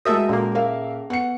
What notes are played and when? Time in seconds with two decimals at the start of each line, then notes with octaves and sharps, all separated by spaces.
0.05 G#3 F#4 A4 A#4 E5 D#6 G6 A#6
0.29 A#2 A#3 C#4 G#4 A4
0.55 A#4 E5 F5
1.10 B3 F#5 C#7